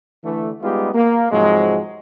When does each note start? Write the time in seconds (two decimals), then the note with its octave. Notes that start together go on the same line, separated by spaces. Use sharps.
0.24 D3 E3 A3
0.62 G3 G#3 B3 D#4 F4 G4
0.94 A#3
1.32 G#2 C3 F3 F#3 G#3